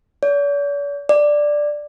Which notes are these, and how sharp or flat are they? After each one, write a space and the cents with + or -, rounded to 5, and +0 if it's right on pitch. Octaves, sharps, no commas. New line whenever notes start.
D5 -45
D5 +5